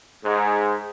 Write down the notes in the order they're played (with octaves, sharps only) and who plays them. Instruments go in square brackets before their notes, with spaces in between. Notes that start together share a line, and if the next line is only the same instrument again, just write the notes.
[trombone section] G#2